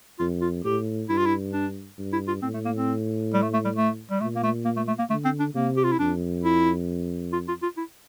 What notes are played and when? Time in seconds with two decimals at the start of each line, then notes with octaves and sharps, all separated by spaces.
0.20 F2 F4
0.42 F4
0.64 A2 G4
1.09 G2 E4
1.18 F4
1.26 E4
1.53 D4
1.98 G2
2.13 E4
2.28 F4
2.42 A2 C4
2.54 A3
2.65 A#3
2.76 C4
3.34 G3
3.43 A3
3.54 A3
3.65 G3
3.76 A3
4.11 G3
4.21 A#2 A3
4.36 A#3
4.44 A3
4.65 A#3
4.77 A3
4.88 A3
4.99 A#3
5.10 D3 A3
5.25 C4
5.40 D4
5.54 C3 A#3
5.77 G4
5.84 F4
5.92 E4
5.99 F2 D4
6.44 E4
7.33 F4
7.48 F4
7.63 F4
7.77 E4